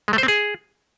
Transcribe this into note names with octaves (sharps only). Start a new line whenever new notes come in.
G#3
A3
C5
C4
G#4